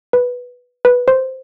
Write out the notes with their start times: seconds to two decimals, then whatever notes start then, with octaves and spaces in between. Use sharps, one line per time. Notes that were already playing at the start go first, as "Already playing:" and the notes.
0.13 B4
0.85 B4
1.08 C5